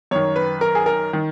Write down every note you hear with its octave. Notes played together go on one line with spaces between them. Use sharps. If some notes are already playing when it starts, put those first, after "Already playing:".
F#2 D#3 C#5
B4
A#4
G#4
A#4
D#3